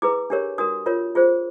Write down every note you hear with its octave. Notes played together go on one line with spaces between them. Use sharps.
E4 G#4 B4 D6
D4 G4 A#4 C#5
D4 F#4 A#4 D#6
F4 A#4 C#5
F4 G#4 C5